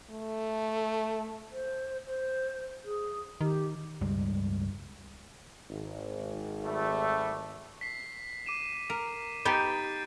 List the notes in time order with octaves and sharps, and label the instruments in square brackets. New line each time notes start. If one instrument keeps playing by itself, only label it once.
[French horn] A3
[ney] C5
C5
G#4
[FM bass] D#3 [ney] G4
[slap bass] C#2 G2 G3 G#3
[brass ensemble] G#1
[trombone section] G3 A3
[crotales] B6 C7
D6 D#7 E7
[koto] A#4
[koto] B3 D#4 G4 [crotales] G6 A6 D7